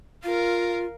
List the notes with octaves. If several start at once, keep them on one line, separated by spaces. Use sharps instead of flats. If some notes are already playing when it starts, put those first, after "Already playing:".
F4 A#4 F5